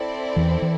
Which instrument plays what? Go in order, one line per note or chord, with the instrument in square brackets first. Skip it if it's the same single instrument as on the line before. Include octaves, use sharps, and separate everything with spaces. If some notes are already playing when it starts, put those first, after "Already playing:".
Already playing: [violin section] C4 E4 A4 D5
[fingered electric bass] E2 E3
E3